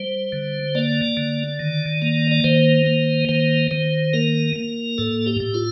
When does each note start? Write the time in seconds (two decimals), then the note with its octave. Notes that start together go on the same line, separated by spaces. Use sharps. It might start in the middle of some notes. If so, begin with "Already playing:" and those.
Already playing: G3 C5
0.32 D3
0.75 A#3 D5
1.17 D3
1.59 D#3
2.02 A#3
2.31 D5
2.44 D#3 C5
2.86 A#3
3.29 D#3 C5
3.71 D#3 C5
4.13 A#3 A#4
4.56 A#3
4.98 A2 A4
5.26 G4
5.40 A2
5.54 F4